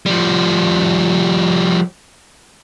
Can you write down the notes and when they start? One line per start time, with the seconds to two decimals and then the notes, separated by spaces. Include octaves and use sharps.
0.06 F3 G3